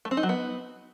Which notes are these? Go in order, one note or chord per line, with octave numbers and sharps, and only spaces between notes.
A3
C4
D#4
F#3
B3